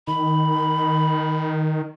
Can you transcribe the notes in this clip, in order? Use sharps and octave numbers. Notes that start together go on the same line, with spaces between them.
D#3 B5